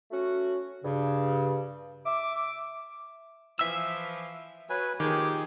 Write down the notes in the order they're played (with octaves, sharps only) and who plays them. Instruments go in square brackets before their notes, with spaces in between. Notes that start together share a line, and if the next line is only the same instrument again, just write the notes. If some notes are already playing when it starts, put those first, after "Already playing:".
[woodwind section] A3 C#4 F#4
G2 C#3
E5 D6
[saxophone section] E3 F3 [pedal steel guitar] E5 E6
[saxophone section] F#3 [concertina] B4 G#5
[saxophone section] A#2 F3 G4 [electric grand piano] D#3 G#4 [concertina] G#5 D6